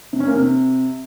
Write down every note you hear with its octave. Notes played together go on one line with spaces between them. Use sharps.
C3
C#4
A#3
C3